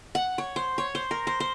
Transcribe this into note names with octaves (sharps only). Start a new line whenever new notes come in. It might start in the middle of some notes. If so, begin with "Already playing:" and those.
F#5
C#5
C5
C#5
C5
A#4
C5
C5